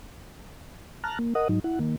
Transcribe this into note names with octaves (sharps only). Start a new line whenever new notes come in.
A5 A#5 F6 F#6
A#3
A#4 D#5 F#5 D#6
G#2 F#3 D#4
E4 F#5
D#3 A#3